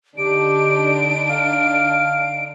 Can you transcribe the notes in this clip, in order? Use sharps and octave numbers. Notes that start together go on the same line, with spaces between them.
D3 D4 D#4 G4 D7
F5